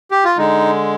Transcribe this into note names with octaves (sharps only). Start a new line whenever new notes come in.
G4
F4
D3 G#3 D#4